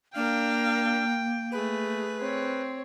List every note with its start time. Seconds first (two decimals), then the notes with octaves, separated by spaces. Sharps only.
0.15 A#3 D4 A#4 F5 G5
1.52 A3 G#4 B4
2.19 C4 C#5